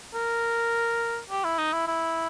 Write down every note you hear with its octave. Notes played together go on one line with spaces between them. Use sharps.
A#4
G4
E4
D#4
E4
E4